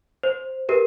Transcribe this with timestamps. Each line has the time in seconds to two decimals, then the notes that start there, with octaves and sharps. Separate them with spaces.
0.23 C5
0.69 G4 A#4 B4